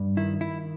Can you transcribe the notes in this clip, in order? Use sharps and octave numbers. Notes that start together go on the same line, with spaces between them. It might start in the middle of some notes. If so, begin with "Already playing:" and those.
Already playing: G2
D#3 E4
E4